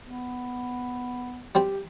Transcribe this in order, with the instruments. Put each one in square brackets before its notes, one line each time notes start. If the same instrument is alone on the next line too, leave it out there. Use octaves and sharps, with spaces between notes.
[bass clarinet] B3
[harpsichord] G3 C4 G5 [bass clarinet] G4